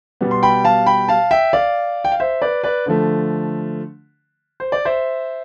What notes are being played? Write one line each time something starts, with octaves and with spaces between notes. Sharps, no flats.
B2 G3 B3
C6
G5 B5
F5 A5
G5 B5
F5 A5
E5 G5
D5 F5
G5
F5
C5 E5
B4 D5
B4 D5
D3 F3 A3
C5
D5
C5 E5